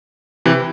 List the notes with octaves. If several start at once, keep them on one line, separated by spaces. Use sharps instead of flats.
C3 E3